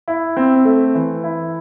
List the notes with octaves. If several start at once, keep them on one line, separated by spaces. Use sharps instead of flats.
E4
C4
A3
E3
E4